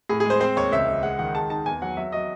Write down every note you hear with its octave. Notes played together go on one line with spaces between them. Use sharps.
A2 G#4
G#3 G#4
C5
C4 C5
D#2 C#5
C#2 E5
C#2
G#3 F#5
D#3 F#5
G#3 A5
D#4 A5
E2 G#5
F#3 F#5
F#3 E5
F#3 D#5